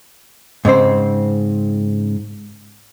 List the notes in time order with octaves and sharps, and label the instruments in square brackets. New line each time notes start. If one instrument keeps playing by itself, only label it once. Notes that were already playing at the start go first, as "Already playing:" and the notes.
[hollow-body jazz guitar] G#2 C#3 C4 C5